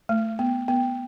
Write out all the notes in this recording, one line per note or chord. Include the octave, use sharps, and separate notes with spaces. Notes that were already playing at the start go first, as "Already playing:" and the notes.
A3
B3
B3